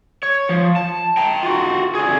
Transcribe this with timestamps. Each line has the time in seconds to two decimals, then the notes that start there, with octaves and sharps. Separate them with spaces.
0.23 C#5
0.49 F3
0.76 A5
1.17 G5 A#5
1.43 F4 F#4
1.95 D3 G#4